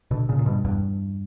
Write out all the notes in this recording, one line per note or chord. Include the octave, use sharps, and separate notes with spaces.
B2 D3
A#2 C#3
A#2
G2 B2
E2 G2